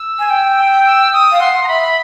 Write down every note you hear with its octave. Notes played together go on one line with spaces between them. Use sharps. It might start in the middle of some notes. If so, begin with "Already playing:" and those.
Already playing: E6
G#5
G5
E6
D#6
F5
F#5 C6
A#5
E5 B5